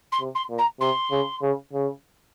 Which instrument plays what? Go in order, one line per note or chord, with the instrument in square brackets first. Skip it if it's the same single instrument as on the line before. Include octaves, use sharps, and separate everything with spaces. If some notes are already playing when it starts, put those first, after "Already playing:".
[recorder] C6
[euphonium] C3
[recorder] C6
[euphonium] A#2
[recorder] A#5
[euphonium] C3 [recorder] C6
[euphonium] C#3
C#3
C#3